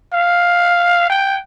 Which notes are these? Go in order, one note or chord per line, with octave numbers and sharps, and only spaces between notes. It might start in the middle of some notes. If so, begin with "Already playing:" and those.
F5
G5